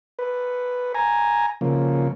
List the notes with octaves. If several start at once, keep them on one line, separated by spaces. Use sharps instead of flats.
B4
G#5 A#5
C#3 F3 A#3